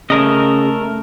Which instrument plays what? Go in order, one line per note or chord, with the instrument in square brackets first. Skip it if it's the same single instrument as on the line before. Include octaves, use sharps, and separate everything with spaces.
[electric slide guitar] C#3 [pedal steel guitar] A3 A#4 D#5